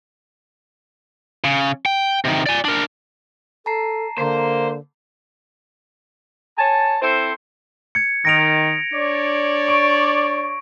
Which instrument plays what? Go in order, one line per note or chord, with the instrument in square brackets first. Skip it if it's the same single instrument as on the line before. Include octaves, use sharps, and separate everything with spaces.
[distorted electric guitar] C#3
G5
C3 D#3
D5 G#5
D4 A#4
[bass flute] A4 [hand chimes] A5 A#5 C7
[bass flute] D3 [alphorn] A#3 [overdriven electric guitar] C5
[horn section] C#5 G#5 A5
C4 E4 A4 C5
[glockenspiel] G#6 C#7
[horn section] D#3 [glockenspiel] A#6 D7 F7
[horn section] D4 C#5 D5
[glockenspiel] C#6 D7